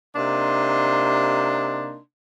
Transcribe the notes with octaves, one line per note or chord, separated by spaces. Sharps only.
C3 A#3 D4 D#4 C6